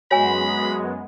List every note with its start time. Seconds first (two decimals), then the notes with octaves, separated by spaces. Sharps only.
0.11 F#2 G#3 B3 F#4 C#5 G#5 B5